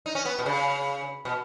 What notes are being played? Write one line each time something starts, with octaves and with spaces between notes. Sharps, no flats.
D#4
C#4
B3
B2
C#3
B2